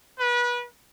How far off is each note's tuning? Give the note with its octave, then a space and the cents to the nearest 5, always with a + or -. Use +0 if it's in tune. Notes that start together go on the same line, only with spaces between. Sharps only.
B4 -30